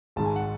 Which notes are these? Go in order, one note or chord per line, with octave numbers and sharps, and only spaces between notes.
G#1 G#2 D#3 A5
G#5
F#5